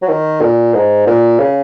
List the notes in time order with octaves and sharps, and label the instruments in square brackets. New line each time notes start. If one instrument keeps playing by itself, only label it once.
[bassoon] F#3
D#3
A#2
G#2
A#2
C#3